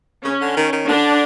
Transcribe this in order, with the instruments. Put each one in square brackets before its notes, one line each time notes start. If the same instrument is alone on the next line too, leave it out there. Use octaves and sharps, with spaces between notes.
[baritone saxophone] C#3 [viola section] C#4
[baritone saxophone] D3
D#3
D#3
[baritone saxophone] D3 [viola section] D4